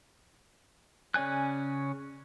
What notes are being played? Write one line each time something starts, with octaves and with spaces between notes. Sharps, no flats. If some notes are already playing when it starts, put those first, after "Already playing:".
C#3 C#4 D5 G#5 F#6